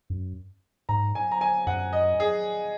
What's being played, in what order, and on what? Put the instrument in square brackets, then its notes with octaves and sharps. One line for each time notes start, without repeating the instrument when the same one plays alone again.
[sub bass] F#2
[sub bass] G#2 [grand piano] A#5
[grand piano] G#5
A#5
G#5
[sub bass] F#2 [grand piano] F#5
[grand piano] D#5
G#4